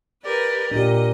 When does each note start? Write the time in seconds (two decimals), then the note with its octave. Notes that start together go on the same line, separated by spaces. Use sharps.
0.24 G4 A#4 B4 D5
0.71 A#2 D4 G4 D#5